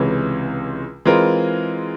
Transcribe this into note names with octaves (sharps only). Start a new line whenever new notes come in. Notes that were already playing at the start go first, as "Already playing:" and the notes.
Already playing: C#2 C3 E3 G#3 C#4
E3 G#3 C4 F4 A#4